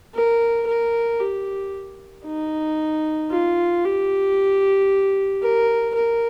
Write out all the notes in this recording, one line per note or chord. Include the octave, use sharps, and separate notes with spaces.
A#4
A#4
G4
D#4
F4
G4
A#4
A#4